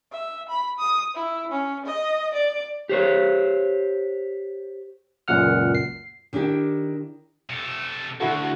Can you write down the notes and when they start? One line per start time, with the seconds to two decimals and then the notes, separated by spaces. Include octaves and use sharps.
0.12 E5
0.49 B5
0.79 D#6
1.14 E4
1.52 C#4
1.86 D#5
2.34 D5
2.89 G4 C5 C#5
5.28 C#2 F#2 A#2 F#5 F6
5.75 C7
6.33 D#3 D4 E4 G4
7.50 C3 A3
8.20 D2 D3 E4 F#4 A4